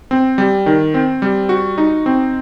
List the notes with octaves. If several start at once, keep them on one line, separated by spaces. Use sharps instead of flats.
C4
G3
D#3
C4
G3
F#4
D#4
C4